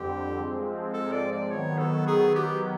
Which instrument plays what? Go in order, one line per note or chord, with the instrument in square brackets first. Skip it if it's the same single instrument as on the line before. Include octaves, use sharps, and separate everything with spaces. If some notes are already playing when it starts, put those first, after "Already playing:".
Already playing: [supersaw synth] F2 D3 G3 C4 [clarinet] G4
[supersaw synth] G#2 F3 G#3 C4
[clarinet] A4
D5
D5
[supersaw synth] D#3 F#3 B3 [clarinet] C#5
[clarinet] A4
G#4
G4